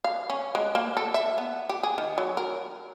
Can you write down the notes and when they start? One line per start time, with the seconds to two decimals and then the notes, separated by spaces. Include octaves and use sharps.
0.04 F5
0.30 C#4
0.55 G#3
0.75 A#3
0.97 A4
1.14 E5
1.38 B3
1.69 G4
1.83 G#4
1.98 D#3
2.18 F#3
2.37 A#4